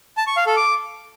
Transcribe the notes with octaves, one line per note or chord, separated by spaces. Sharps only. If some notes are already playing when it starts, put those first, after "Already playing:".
A5
C#6
F5
A4
D6